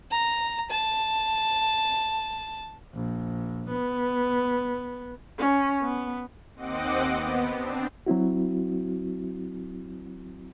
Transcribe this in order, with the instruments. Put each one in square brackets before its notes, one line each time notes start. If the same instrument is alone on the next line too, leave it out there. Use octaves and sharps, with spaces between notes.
[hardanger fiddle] A#5
A5
[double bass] A#1
B3
[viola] C#4
B3
[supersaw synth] D#2 C4 D#5 F#5 D6
B3
C4 D4
[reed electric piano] F#3 C4 E4 F#4